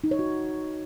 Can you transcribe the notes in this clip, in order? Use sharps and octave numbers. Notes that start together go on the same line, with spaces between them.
D#4
C#5
F#4